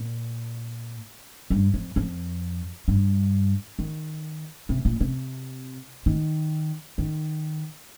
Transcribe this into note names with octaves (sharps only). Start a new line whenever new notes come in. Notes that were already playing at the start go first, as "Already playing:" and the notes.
Already playing: A#2
G2
F2
F2
G2
D#3
C3
A#2
C3
D#3
D#3